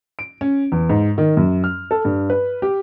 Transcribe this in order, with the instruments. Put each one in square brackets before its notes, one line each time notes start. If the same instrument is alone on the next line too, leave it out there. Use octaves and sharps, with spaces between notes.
[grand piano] D7
C#4
E2
G#2
D#3
F#2
F6
A4
G2
B4
G4